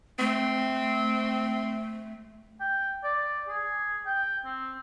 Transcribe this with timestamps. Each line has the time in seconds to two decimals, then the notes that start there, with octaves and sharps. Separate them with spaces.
0.19 A3 C4
2.60 G5
3.04 D5
3.48 G#4
4.06 G5
4.45 C4